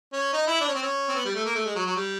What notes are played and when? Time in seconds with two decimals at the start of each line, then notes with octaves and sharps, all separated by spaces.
0.13 C#4
0.33 D#4
0.47 E4
0.61 D4
0.68 C#4
0.75 C4
0.82 C#4
1.09 C4
1.15 B3
1.25 G3
1.35 A3
1.45 A#3
1.55 A3
1.65 G#3
1.75 F#3
1.86 F#3
1.96 G3